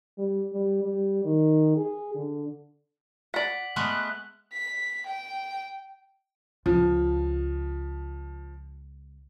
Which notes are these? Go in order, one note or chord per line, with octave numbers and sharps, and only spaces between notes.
G3
G3
G3
D#3
G#4
D3
D5 F#5 B6 F#7
G#3 A3 B3 F6 F#6 B6
B6
G5
C#2 F3